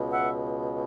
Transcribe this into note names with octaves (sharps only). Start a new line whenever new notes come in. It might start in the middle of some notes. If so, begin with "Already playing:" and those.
Already playing: C#2 B2
E5 F#5